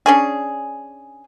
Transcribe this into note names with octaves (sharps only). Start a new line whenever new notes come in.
C#4 D4 G#4